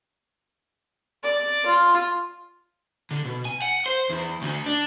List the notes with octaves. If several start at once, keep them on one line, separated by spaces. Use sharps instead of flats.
D5
F4
D3
B2
G#5
F#5
C5
E2
D2
D4